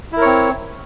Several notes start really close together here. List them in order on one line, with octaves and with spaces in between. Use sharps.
E4 A#4 C#5 C4